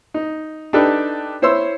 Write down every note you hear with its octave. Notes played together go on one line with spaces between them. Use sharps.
D#4
D4 D#4 G4 A4 B4
E4 C5 C#5 C6 E6